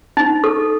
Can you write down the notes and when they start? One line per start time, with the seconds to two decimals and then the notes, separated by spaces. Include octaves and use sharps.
0.17 D#4
0.44 A4